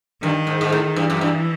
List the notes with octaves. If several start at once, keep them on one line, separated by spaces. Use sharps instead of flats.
G2 D#3
G#2
G#2
A2
G2 E3
F#2
G2